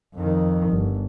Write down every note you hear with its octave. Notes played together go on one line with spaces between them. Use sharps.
F2 D#3
G1